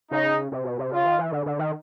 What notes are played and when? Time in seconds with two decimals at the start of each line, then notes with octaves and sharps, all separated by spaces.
0.11 C#3 D#4
0.52 C3
0.65 B2
0.79 C3
0.92 C#3 F4
1.05 D#3
1.19 E3
1.32 D3
1.46 D3
1.59 D#3